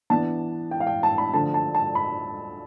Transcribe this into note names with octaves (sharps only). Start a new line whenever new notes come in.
E3 B3 D4 A5
G5
F5
G5
A5
B5
D3 F3 A3 D4 A5
A5
A5
B5